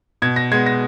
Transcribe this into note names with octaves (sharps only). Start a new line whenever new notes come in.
B2 G#6
A#6
G#3 B3 G#6
A#6